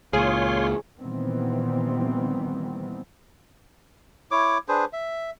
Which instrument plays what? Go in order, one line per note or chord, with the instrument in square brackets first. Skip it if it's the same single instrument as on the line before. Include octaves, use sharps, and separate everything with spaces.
[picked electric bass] C#2 A#2 [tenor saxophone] F4 [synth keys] G#4 [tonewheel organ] C#5 C6
[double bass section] A#2 D#3 E3 G3 B3 C4
[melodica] E4 C#5 D6
D4 G#4 B4 C5
E5